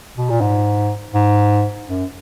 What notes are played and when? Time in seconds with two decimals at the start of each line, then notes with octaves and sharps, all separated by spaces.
0.17 B2
0.29 A#2
0.41 G#2
1.14 G#2
1.87 F#2